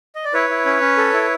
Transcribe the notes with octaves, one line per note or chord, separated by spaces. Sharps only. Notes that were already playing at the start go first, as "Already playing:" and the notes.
D#5
D5
E4 B4 C#5
E4
C#4
C#4
A4
E4